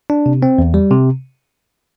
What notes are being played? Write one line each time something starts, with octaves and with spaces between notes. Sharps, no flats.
D4
C3
C4
E2
G3
C3